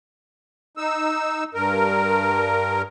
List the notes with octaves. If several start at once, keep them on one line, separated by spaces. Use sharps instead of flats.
D#4 E6
G2 A#4